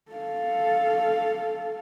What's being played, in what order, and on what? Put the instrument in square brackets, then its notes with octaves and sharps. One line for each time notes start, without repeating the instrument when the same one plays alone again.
[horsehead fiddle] A4 F5